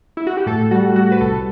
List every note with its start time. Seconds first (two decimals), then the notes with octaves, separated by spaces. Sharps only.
0.17 E4
0.27 F#4
0.37 G4
0.46 A2 A4
0.71 G3 F#4
0.96 G3 F#4
1.12 B4
1.21 C2 A4